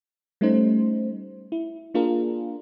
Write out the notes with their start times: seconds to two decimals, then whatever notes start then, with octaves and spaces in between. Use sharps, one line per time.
0.41 G3 A3 C#4 D#4 C5
1.52 E4
1.94 A#3 D4 F4 G#4 A#4